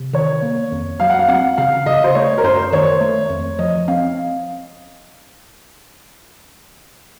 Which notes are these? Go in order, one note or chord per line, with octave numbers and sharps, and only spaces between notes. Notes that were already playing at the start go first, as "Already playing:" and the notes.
Already playing: C3
D#3 C#5
A#3
F2
F#3 F5
F#5
F5
C4 F#5
C#3 F5
C#3 D#5
C5
A3 C#5
A#4
F#2 C5
D#3 C#5
A3
F2
F3 D#5
C4 F5